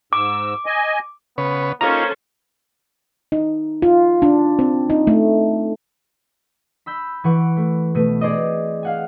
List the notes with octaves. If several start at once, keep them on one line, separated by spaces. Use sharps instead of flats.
G#2 D6 E6
D#5 G#5
C#3 B3 B4 C#5
A#3 C#4 D#4 F4 A4 C5 C#5 A#5
D#4
F4
D4
C4
D#4
A3
B5 E6 G6
E3 F#5 C#6 D7
A3
B2 A3 D#7
C4 G#4 C5 D5 D#5
F5 F#5 G#5